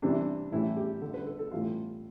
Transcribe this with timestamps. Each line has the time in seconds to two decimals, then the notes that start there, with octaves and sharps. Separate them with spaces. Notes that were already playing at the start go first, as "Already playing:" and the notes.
0.02 C3 E3 G3 D4
0.52 A2 E3 G3 E4
0.77 G4
1.01 D3 G3 A4
1.14 B4
1.26 A4
1.39 A4
1.51 A2 E3 G3 F4